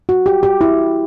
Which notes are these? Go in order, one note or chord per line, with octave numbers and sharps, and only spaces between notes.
F#4
G4
G4
E4